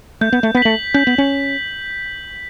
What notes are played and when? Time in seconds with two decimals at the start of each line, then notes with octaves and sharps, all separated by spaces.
0.21 A3 G6
0.33 B3
0.43 A3
0.55 B3 B6
0.62 A3 F#7
0.94 C#4 G6
1.07 B3
1.18 C#4